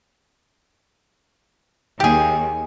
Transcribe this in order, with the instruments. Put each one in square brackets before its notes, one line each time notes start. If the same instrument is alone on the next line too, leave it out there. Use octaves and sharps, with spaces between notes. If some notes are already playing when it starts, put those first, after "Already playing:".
[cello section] D#2 [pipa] G4 G#4